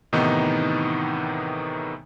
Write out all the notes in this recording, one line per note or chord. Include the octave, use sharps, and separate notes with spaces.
A2 C3 D#3 E3 B3 D#4